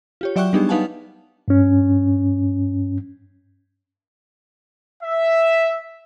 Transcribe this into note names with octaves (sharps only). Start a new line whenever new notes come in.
F4 G4 C#5
F#3 D5 E5 G5 C#6 F#6
G3 B3 D4 D#4 G4 G#4
D#4 B4 F5 F#5 G#5 A5
G2 C#4
E5